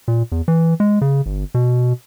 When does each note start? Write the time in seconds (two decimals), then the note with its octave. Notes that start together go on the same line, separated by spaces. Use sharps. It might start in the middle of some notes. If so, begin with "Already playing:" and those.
0.08 A#2
0.32 E2
0.48 E3
0.80 G#3
1.01 C#3
1.26 G1
1.54 B2